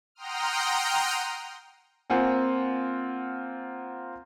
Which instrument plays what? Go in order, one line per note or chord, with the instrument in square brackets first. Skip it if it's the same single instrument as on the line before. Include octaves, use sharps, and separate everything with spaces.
[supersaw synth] F#5 G5 A#5 C6 D#6 F6
[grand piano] A#3 C4 F4 F#5 G#5